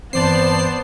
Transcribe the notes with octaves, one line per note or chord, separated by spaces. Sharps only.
G2 E3 B3 C4 C5 D5 A5 C7